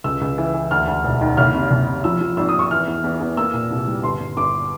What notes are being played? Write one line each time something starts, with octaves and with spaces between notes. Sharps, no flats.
C#2 E6
C#2
E3
E3
D2 F6
D2
E1
D#3
F#1 F6
C3
F#1
C3
F3 E6
F3
G#1 E6
G#1 D#6
C#6
E3 F6
E2
E2
E2
A#3 E6
A#2
C2
G3
G1 C6
G1
G1 D6